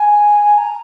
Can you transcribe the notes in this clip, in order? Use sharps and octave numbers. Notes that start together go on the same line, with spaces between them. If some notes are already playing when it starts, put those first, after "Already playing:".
Already playing: G#5
A#5